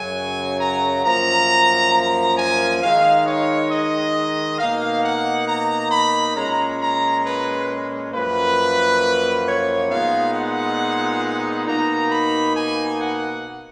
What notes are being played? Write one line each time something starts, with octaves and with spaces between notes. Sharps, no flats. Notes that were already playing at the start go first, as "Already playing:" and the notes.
Already playing: F#2 C#3 F#3 G#5
A#5
F#2 F3 A#3 A#5
A#5
G#5
D#3 G#3 D#4 F5
C#5
D#5
B2 A#3 D#4 F5
F#5
A#5
B5
A#2 G#3 C#4 A#5
A#5
B4
F#2 F3 A#3 B4
C#5
A#2 G#3 B3 D#4 F5
F#5
B2 A#3 D#4 A#5
B5
G#5
F#5